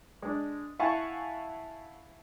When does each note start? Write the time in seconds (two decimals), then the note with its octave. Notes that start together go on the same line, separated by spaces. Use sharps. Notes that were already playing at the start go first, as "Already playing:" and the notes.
0.22 G#3 D4
0.79 E4 F5 F#5 G#5 A5 C#6